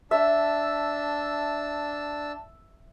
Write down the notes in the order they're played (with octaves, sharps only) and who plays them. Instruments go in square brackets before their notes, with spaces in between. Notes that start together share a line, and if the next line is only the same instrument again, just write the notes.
[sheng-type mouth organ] D4 A5 E6 [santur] E5